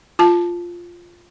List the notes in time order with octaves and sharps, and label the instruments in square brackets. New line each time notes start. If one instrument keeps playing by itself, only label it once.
[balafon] F4 A5